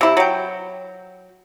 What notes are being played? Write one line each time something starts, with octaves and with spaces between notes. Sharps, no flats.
C3 E4
F#3 G5